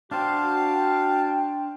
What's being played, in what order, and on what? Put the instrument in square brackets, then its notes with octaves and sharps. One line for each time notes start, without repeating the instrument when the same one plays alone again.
[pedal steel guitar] D4 C5 [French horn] F#4 [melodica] F5 A5 [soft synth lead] G5